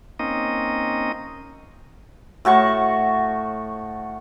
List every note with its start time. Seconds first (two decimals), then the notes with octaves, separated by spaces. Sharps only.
0.19 A#3 C4 C#4 D#4 D#5
2.45 A2 F#4 A5 C#6